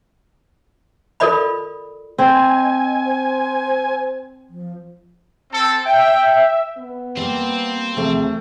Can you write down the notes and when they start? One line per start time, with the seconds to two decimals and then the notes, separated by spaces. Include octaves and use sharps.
1.20 F4 A4 A#4 D5 D#5 B5
2.19 C4 D#5 G#5
3.05 C5
4.50 F3
5.52 C4 A4
5.85 E5 G5
6.78 B3
7.17 G3 A#3 C4
7.97 D#2 C3 F3 A3 G#4